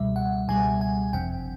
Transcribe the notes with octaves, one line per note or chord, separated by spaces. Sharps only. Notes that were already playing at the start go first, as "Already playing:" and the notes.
Already playing: C#2 B2 G3 E5
F#5
C#2 B2 G3 G#5
G#5
G1 F2 C3 G5